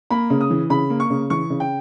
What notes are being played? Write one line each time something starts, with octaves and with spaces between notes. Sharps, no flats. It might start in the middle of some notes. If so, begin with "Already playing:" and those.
A#3 B5
C#3
D#6
E3
C#3 B5
A#3
C#6
C#3
E3 C#6
C#3
G5